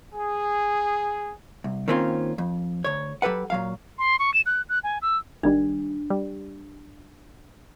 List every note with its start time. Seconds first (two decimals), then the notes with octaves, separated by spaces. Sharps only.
0.15 G#4
1.64 C2
1.88 D#3 A#3 C4 C#4 F4
2.38 F2
2.84 D2 C#5
3.22 F#3 G4 A4 B4 F#5
3.50 A#2 F#3 F5
3.98 C6
4.19 C#6
4.34 E7
4.46 F#6
4.69 F#6
4.84 G#5
5.02 E6
5.43 G#1 D#3 G3 D4
6.10 G3